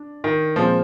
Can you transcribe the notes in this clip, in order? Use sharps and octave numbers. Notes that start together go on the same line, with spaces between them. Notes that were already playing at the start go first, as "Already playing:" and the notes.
Already playing: D4
D#3
A#2 F3 G#3 C4